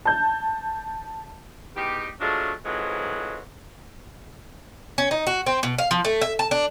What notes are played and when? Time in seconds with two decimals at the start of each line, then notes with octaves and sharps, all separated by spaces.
0.05 A5 G6
1.76 E2 D#4 G4
2.20 F3 F#3 G#3 A3 D4
2.65 F2 G#2 E3 F#3 G#3
4.98 C#4
5.11 D#4
5.27 F#4
5.46 C4
5.63 B2
5.78 F5
5.91 F3
6.05 A3
6.21 E5
6.39 A5
6.51 D4